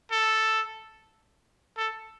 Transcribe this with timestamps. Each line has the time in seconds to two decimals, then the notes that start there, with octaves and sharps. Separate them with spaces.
0.11 A4
1.77 A4